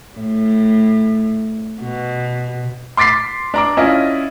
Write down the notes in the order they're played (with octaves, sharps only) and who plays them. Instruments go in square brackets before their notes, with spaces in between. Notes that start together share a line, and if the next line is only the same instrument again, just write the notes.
[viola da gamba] A2
B2
[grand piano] C6 D6 A6 B6 C7
D4 A#5 D6
C#4 D4 E4 F4 D#5